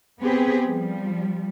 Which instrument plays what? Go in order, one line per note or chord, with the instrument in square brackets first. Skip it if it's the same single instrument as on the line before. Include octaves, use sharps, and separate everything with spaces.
[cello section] B3 C4 G4 G#4 B4
F3 G3